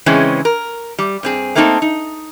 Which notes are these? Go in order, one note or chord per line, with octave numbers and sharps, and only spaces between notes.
C#3 E3 G#3 C4 C#4
A#4
G3
G2 C4 G#4
A3 A#3 C4 D#4 G#4 A4
D#4